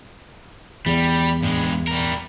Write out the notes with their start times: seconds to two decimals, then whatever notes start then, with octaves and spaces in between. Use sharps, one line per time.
0.86 E2 G3
1.43 G2 G#3
1.87 G3 A#4